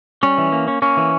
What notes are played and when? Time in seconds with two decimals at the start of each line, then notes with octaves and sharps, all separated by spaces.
0.23 G3 C#4
0.38 E3
0.52 A#3
0.68 C#4
0.82 A#3 C#4
0.97 E3